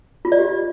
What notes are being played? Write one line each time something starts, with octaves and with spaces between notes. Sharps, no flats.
F4
D5
G4